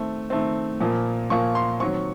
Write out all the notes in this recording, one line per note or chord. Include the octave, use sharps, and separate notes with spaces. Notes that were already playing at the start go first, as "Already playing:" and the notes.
Already playing: D#3 A3 C4
D#3 A3 C4
A#2 F3 A#3
A#2 F3 A#3 C#6
C6
D#3 F#3 C4 C#6